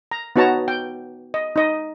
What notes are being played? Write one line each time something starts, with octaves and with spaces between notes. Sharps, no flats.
A#5
B3 D#4 F#4 C#5 A5 A#5
G5
D#5
D#4 D#5